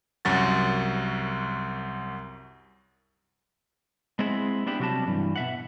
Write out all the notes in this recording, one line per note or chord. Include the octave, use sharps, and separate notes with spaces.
C2 F#2 F#4 A6
G#3 B3 C4 E4 G#4
B3 D4 E4 G4
C3 F#3 G3 F#4 G4 A5
G2 E3
B2 E5 F#5